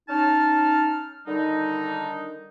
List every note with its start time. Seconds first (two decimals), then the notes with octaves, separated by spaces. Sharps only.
0.09 C#4 D#4 A5 F6
1.27 D3 D#3 G3 D4 D#4